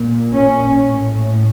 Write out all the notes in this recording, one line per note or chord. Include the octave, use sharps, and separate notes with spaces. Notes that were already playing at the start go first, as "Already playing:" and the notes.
Already playing: A#2
C#4
A2